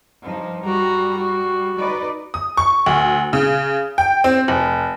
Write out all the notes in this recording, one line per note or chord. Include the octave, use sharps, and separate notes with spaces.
G2 F3 D#4
G3 F#4 A#5
F#4
D#4 B4 D5
D#6
C#6
D2
C#3
G5
C4
F1